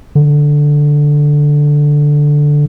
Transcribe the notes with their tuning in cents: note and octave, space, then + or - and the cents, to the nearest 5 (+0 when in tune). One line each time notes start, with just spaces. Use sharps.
D3 +0